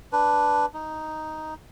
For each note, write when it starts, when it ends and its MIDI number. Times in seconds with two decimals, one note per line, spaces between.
0.13 0.66 62
0.13 0.66 71
0.74 1.54 63